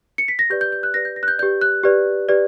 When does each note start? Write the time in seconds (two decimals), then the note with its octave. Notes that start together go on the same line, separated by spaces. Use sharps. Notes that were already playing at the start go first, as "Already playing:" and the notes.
0.18 C#7
0.28 B6
0.39 A#6
0.50 G4 B4 D5 G6
0.61 G6
0.72 G6
0.83 F#6
0.94 G4 B4 D5 A#6
1.05 G6
1.16 A#6
1.23 F#6
1.28 G6
1.39 G4 B4 D5 G6
1.61 F#6
1.83 G4 B4 D5
2.29 G4 B4 D5